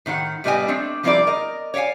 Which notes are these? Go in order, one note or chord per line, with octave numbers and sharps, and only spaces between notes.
A2 D#3 F4 F#5
A2 G3 B3 C4 D#5 G#5
A3 C4 D4
F3 G3 C4 E4 A#4 D5
A#4 D#5
C#5 D5 E5 F5 G#5